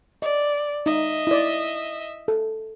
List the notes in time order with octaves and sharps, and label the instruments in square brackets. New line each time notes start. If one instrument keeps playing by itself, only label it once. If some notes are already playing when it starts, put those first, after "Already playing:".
[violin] D5 [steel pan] D#5
[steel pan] D#4 [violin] D#5 E5
[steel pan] E4 D5
A4